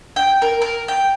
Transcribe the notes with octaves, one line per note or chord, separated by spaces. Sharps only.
G5
A#4
A#4
G5